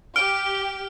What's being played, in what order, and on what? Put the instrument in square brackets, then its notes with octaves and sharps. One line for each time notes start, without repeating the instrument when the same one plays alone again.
[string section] G4 [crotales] F6 [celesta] D7